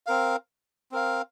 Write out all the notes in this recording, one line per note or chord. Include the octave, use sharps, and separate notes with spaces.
C4 A#4 F5
C4 A#4 F5